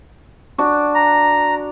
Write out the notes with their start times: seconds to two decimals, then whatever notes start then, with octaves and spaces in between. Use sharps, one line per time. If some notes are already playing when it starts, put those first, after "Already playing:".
0.58 D4 F#4
0.95 A#5